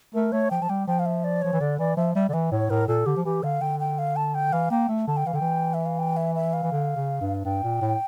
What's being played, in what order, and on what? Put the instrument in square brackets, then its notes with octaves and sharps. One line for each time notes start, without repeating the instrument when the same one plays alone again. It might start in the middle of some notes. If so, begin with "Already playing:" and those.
[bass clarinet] A3 [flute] A#4
[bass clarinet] A3 [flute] C#5
[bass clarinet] F3 [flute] G5
[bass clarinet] F3 [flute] A5
[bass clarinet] G3 [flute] G5
[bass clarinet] F3 [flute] G5
[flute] F5
E5
D5
[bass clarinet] F3 [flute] C#5
[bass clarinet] E3
[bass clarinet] D3 [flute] D5
[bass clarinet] E3 [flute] D5
[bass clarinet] F3 [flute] E5
[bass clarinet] G3 [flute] E5
[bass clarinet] D3 [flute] D5
[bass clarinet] E3 [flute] E5
[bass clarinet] A2 [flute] C#5
[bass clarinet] A2 [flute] A#4
[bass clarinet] A#2 [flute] A4
[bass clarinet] D3 [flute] G4
[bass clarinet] F3
[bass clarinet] E3 [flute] G4
[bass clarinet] D3 [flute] F5
[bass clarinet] D3 [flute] G5
[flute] G5
F5
A5
G5
[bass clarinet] E3 [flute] F5
[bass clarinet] A#3 [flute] G5
[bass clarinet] A3
[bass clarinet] D3 [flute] A5
[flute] G5
[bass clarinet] E3 [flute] F5
[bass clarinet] D3 [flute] G5
[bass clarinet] E3
[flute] E5
F5
G5
E5
E5
F5
[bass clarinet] E3
D3
C#3
G2
[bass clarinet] G2 [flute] G5
[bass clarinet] A#2
A2